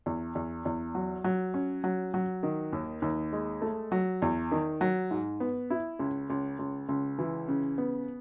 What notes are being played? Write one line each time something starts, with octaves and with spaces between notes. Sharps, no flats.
E2
E2
E2
F#3
F#3
C#4
F#3
F#3
D#3
D#2
D#2
G#3
A3
F#3
E2
D#3
F#3
G#2
B3
E4
C#2
C#2
C#2
C#2
E3
C#3
B3